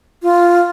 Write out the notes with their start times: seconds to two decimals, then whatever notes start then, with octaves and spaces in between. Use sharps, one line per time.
0.23 F4